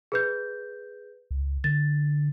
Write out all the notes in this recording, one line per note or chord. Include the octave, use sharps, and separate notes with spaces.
G#4 B4 G6
C#2
D3 A6